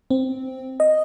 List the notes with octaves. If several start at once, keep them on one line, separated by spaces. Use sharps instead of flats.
C4
D#5